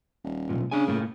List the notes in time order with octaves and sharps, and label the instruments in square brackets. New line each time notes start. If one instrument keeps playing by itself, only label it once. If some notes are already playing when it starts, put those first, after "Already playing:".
[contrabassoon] D#1
[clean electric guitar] B1 G2 A#2
[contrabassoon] C#3 [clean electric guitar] D4 G#5
[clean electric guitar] A2 A#3